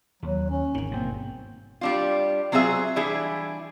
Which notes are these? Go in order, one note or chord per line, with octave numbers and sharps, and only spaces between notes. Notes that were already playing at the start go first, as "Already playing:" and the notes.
D#2 F#3
C#4
G#1 G2 D#3
B2 G3 A#3 C4
G3 D4 F4
F#3 C4 F4 G#4 E5
E3 G3 D4 E4 G#4